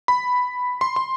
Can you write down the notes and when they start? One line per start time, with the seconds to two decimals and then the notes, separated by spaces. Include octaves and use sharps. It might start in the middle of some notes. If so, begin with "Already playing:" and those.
0.08 B5
0.81 C6
0.96 C6